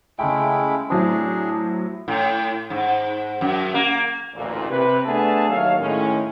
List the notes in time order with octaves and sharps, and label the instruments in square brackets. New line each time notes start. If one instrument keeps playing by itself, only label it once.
[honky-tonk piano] C#3 G5 [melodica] G#3 A3 E4
[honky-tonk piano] A2 F#3 C4 [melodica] D4 G#4
[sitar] A2
G#2
F#2
A#3
[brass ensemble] A1 D2 A#2
C3 B4
A3 B3 D4 G#4 E5 A5
D#2 F#3 A#4 C#5 F5
A2 D#3 G#3 C#4